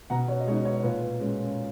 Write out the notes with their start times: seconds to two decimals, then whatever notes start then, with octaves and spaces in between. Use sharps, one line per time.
0.10 B2 F#5 A#5
0.28 C#5
0.40 D#5
0.47 G#3 B3 D#4 C#5
0.65 C#5
0.83 A#2 B4
1.20 G#3 C#4